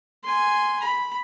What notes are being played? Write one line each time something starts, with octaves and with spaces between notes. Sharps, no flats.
G#5 C6
B5